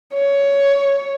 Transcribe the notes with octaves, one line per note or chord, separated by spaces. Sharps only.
C#5